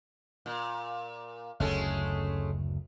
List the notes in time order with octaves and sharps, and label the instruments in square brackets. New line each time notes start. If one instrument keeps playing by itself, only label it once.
[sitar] A#2
[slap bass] F#1 D2 [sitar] G#3 A3 C#4